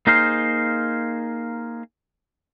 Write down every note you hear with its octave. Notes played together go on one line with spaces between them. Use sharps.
A#3 D#4 G#4 C5 F5